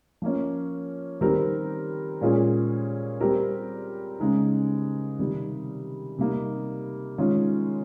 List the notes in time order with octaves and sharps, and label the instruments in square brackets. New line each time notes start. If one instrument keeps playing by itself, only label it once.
[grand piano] F3 A#3 C#4
D#3 G3 C4 G4 A#4
A#2 G#3 C#4 F4 G#4
G3 C4 G4 A#4
C#3 G#3 D#4
C3 D#3 G3
C3 G3 A#3 D#4
D#3 G#3 C#4 F4